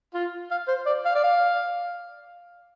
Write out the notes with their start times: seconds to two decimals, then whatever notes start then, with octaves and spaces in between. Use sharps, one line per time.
0.14 F4
0.51 F5
0.68 C5
0.86 D5
1.06 F5
1.15 D5
1.24 F5